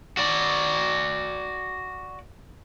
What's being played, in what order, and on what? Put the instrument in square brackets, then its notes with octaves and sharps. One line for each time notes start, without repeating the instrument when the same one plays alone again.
[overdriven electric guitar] F#4 D5